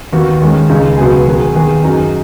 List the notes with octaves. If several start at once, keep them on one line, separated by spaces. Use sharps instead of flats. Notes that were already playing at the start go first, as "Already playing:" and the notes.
D#2 D#3 B3 F#4
D#2 D#3 G#3 C#4
C#2 C#3 G#3 D#4
C#2 B2 F#3 B3 G#4
D#3 F#3 B3 G#4
D#2 D#3 B3 G#4
F#2 F#3 D#4 G#4